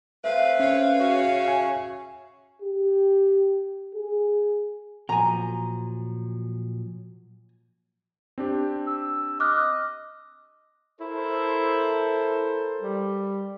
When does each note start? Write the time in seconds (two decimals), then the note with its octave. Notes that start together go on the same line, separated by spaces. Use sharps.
0.24 A3 C4 B4 E5 F5
0.60 C#4 C#5 F5
1.00 C#3 F#4
1.45 E5 G#5
2.62 G4
3.94 G#4
5.09 A#2 F3 F#3 G#5 A#5
8.38 C4 D4 G4
8.87 E6
9.40 D#5 D6 F6 F#6
11.00 E4 A4 A#4 C5
12.81 G3